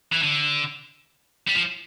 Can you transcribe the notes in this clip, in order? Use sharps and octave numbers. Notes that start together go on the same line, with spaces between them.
E3
D3
G3
F3